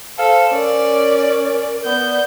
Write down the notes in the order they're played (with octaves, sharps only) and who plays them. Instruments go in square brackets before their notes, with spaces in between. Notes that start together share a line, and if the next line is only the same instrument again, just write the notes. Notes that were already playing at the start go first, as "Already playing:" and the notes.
[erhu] A4 [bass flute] C5 [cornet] F5
[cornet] C#4 [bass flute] A#4 [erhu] D5
[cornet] B3 [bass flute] D5 [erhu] G6